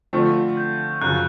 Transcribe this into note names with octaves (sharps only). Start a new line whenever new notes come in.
D3 F3 A3 C4 F4
G6
F#2 C#3 F3 F#6